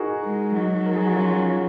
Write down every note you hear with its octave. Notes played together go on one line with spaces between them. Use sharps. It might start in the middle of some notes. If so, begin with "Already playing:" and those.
Already playing: D#4 F#4 G#4 A#4
G#3
F#3 D#4 F#4
A#4
G#4
F#4
C#4 F4